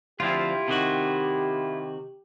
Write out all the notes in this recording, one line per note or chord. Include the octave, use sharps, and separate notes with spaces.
D2 F3 C4 E4 F4 G4
C3 D#3 F#4